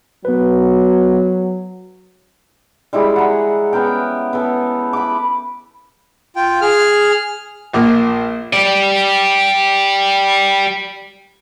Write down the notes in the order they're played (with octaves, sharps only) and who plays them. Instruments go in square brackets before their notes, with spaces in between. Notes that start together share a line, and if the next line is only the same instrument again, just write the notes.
[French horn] F#3 [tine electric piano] B3 B4
[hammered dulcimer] G3 G#3 E4 G#4
F#5 A#5
B3 C#4 A#4 G5
B3 A4
B5 D6
[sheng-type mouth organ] F4 G5
G#4 F6
[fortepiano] A#1 A#3
[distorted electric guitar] G4 D5